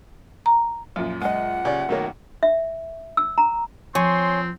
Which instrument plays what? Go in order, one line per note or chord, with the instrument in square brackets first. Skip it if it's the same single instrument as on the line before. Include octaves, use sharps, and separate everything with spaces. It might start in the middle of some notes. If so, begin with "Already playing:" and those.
[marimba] A#5
[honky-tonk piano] F#2 A#2 [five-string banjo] F3
[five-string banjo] G#3 D#5 [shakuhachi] F#5
[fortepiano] C#3 [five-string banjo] G4 D5
[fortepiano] B2 D#3 A#3 [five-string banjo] A3 C#5
[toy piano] E5
E6
A#5
[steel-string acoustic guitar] F3 [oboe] C4 [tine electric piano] C#5 G#5 C#6 [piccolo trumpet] C6